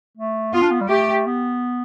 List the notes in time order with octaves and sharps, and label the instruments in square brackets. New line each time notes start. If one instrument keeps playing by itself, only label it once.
[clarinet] A3
[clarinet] B3 [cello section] F4
[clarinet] D4
B3
G3
[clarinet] A3 [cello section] G4
[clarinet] B3